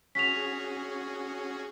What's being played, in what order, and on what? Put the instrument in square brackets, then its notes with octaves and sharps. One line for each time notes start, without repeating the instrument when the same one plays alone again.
[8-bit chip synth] C#4 F#4 G#4 [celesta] B6 F7